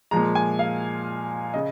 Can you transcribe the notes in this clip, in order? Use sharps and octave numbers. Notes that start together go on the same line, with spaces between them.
A#2 F3 G#3 A#5
G#5
F5
C#3 D#5